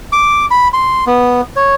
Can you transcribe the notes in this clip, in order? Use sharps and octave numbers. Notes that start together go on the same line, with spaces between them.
D6
B5
C6
B3
C#5